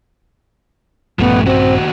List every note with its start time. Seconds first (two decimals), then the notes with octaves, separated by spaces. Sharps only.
1.19 A#1 G2 F3 A3 B3 C#4
1.46 D#2 C4 F#4